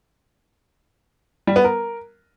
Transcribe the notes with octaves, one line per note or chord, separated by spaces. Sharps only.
G3
B3
A#4